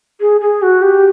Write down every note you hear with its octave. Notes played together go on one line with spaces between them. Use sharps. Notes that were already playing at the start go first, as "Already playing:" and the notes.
G#4
G#4
F#4
G4